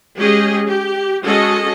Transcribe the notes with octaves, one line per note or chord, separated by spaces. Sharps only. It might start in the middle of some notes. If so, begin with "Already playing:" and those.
G#3 C#4 G4 G#4 D#5
G4
G#3 C#4 F#4 G#4 A4 D#5